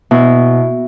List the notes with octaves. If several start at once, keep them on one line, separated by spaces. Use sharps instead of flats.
B2 E4